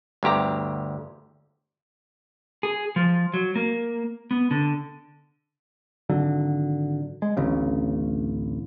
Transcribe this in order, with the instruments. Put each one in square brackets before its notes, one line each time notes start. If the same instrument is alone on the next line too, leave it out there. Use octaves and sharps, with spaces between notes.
[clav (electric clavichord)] G1 D2 G4 A#5
[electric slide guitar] G#4
F3
F#3
A#3
B3
D3
[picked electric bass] G#1 D3 F#3
G#3
D1 A1 C#3